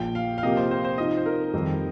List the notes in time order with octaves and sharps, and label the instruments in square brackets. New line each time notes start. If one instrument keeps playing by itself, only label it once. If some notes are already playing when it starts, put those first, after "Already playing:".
Already playing: [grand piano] A#1 A#2 F3 [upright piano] G5
[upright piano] F5
F5
[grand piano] C3 F3 A#3 G4 [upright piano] D#5
[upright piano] C5
C5
C5
[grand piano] C3 F3 D#4 [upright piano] D#5
[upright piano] C5
A#4
[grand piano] F2 D#3 G3 C4